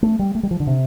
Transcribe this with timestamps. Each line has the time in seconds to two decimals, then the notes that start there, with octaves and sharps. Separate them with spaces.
0.03 A3
0.19 G3
0.35 A3
0.43 G3
0.51 F3
0.60 D3
0.67 C3